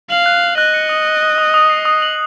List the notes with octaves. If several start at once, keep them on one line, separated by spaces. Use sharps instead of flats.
F5 F#7
F#6
F#6
D#5 F#6
C#7
D#6
D#6
D#6
D#6
D#6
C7
D#6
F#7